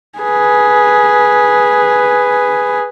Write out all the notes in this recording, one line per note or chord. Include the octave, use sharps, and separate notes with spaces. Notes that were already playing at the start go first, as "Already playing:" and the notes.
G#4 B4